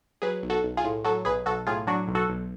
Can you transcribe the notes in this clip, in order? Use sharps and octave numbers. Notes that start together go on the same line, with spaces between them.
F#3 G#4 B4
B1
F#4 A4
B1
F4 G#4
A2
F#3 F#4 A4
B1 G#4 B4
B1 F#4 A4
A2 F4 G#4
F#3 D4 F#4
B1
F#4 A4
B1